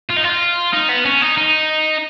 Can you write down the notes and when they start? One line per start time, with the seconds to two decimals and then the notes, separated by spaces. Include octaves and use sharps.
0.09 F4
0.16 D#4
0.24 F4
0.73 D#4
0.89 B3
1.05 C#4
1.22 D#4
1.38 D#4